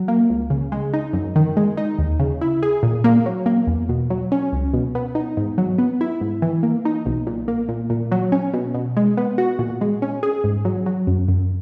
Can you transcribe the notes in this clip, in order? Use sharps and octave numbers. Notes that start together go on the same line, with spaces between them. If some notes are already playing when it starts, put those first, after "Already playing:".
Already playing: F#3
A#3
C#2
C#3
G#3
D#4
F#2
D#3
G#3
D#4
D#2
C#3
E4
G#4
A#2
A#3
F#3
A#3
E2
B2
F#3
C#4
C#2
B2
B3
D#4
G#2
F#3
B3
E4
G#2
E3
A#3
D#4
B1
A#2
A#3
A#2
A#2
F#3
C#4
B2
B2
G#3
B3
F#4
A#2
G#3
C#4
G#4
G#2
F#3
F#3
F#2
F#2